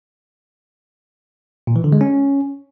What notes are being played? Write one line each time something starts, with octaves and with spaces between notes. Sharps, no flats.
A#2
E3
D3
G#3
C#4